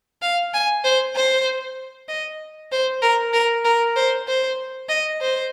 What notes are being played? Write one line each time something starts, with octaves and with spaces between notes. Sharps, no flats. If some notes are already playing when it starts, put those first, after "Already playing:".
F5
G#5
C5
C5
D#5
C5
A#4
A#4
A#4
C5
C5
D#5
C5